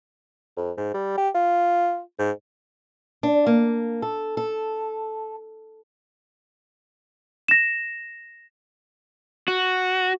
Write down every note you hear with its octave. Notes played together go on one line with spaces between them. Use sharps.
F2
G#2
G3
G4
F4
G#2
D4
A#3
A4
A4
A#6 E7
F#4